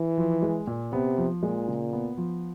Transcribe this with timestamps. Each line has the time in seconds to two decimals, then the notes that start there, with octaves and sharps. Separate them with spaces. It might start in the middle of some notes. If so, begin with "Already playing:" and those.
Already playing: E3
0.18 F3
0.42 G#3
0.67 A#2
0.92 C3 B3
1.18 F3
1.43 A#2 G#3
1.68 C#3
1.93 B3
2.17 F3